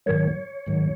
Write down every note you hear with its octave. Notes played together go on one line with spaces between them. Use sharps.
G#2 D#3 F#3 C#5
G#2 D#3 F#3